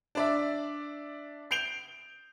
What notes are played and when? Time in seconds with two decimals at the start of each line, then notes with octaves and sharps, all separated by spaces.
0.15 D4 D5 E5
1.51 G6 C7 D7 F7 G7